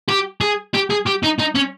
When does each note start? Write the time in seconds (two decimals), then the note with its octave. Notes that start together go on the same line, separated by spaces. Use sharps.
0.09 G4
0.41 G#4
0.74 G4
0.90 G#4
1.06 G4
1.23 D#4
1.39 D#4
1.55 C#4